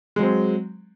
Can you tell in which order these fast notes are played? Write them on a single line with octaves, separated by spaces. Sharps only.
G#3 F#3 C4